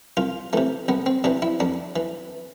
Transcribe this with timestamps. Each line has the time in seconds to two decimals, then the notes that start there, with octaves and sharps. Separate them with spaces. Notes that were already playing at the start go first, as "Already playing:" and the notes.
0.17 C2 F4
0.53 C3 E3 A3
0.88 C2 B3
1.06 C4
1.24 C3 E3 D4
1.42 E4
1.60 F2 D4
1.96 E3